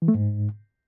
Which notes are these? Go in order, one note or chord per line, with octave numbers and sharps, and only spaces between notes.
E3
A3
G#2